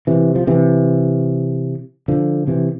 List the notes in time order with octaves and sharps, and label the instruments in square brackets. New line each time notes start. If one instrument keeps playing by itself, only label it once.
[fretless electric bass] C3 E3
F3
C3 E3
D3 F3
C3 E3